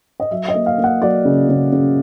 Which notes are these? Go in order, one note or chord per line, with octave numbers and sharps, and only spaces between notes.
D#5
F#3 E5
D#5
A#3
F5
A#3
F#5
F#3 D5
C#3
C#3
C#3